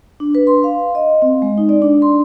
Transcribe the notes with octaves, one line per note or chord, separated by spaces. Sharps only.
D4
B4
C6
F5
D#5
C4
G#3
D#4
D5
D4
C6